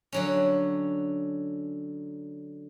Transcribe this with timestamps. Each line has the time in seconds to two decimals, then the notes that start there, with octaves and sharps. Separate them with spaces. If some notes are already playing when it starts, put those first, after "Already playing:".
0.12 D3 F#3 C#4